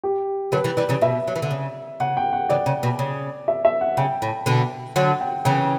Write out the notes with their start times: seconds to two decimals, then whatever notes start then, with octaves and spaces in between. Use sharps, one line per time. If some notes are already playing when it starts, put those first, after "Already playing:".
0.04 G4
0.52 D3 F#3 B4
0.64 E3 G3
0.77 E3 G3 D5
0.89 C#3 E3
1.01 B2 E5
1.28 F#3
1.36 E3
1.42 D3
1.51 C#3
2.00 C#3 F#5
2.17 G5
2.33 F#5
2.49 C#3 E3 D5
2.66 C#3
2.83 B2
2.99 C#3
3.48 E5
3.65 E5
3.81 F#5
3.97 C#3 G5
4.22 A2
4.46 B2 D3
4.96 D3 F#3 F#5
5.21 G5
5.45 C#3 E3 G5